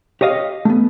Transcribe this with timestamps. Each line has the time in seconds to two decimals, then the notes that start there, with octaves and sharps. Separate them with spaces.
0.21 G4 C#5 D#5 F5
0.65 A3 B3